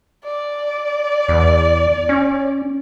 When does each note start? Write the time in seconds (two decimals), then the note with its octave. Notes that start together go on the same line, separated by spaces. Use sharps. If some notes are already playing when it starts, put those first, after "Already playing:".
0.25 D5
1.29 E2
2.09 C#4